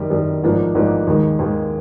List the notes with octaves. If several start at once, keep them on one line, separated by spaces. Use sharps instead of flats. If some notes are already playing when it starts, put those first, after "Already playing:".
Already playing: F#2 D#3 G3
F#2 D#3 G3
A1 G#2 F3 A#3 D4
A1 G#2 F3 A#3 D4
D#2 D#3 G#3
D#2 D#3 G#3